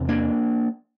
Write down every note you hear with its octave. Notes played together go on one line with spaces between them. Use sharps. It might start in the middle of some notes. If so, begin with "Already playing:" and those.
Already playing: E2 C3
A#3 D4